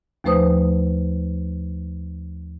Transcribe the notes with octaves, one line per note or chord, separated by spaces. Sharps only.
D#2 F3 A3 B4 C5 D#6